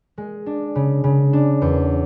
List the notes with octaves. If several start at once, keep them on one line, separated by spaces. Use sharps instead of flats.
G#3
D4
C#3
C#3
D4
E2